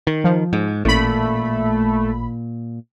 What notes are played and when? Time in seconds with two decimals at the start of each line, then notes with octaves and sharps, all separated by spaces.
0.07 D#3
0.24 F3
0.53 G#2
0.85 A1 A#2 A3 B5